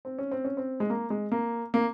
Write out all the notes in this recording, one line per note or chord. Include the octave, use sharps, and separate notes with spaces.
C4
C#4
C4
C#4
C4
G#3
A#3
G#3
A#3
A#3